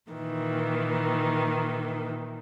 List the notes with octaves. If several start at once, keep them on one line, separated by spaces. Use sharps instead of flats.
A#2 D#3 E3